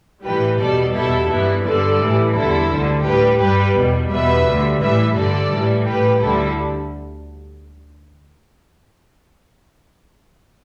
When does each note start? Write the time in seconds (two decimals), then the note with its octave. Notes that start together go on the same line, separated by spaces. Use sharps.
0.24 A2 E3 G3 G4 B4
0.59 E2 B2 G3 A4 D5
0.94 E2 B2 G3 E4 A4
1.29 G2 E3 G3 B3 E4
1.65 G2 D3 G3 A4 D5
2.00 A2 E3 G3
2.35 E2 D3 G3 E4 A4
2.70 D2 D3 G3
3.05 A2 G3 G4 B4
3.40 G2 G3 G4 B4
3.76 E2 B2 G3
4.10 E2 B2 G3 B4 E5
4.46 D2 D3 G3
4.81 A2 E3 G3 B4 E5
5.16 G2 D3 G3 A4 D5
5.51 A2 E3 G3
5.86 A2 G3 G4 B4
6.22 D2 D3 G3 E4 A4